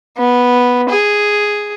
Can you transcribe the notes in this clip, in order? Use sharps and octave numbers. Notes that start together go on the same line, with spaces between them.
B3
G#4